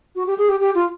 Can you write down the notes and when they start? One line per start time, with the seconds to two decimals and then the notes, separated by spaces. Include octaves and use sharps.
0.15 F#4
0.27 G4
0.38 G#4
0.49 G4
0.60 G4
0.75 F4